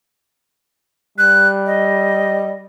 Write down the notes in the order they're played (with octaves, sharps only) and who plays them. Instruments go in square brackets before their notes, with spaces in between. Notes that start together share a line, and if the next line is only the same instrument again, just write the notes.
[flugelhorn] G3 [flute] F#6
[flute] D#5